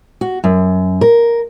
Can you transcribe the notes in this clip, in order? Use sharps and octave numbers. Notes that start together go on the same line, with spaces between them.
F#4
F#2
A#4